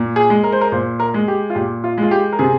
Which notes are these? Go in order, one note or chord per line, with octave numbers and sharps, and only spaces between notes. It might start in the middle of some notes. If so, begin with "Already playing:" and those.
Already playing: A#2
G#4
G#3
A#4
C5
A#4
A#2 C5
A#4
G#3
G4
F4
A#2 G4
F4
G#3
F4
G4
A#4
C3 G#4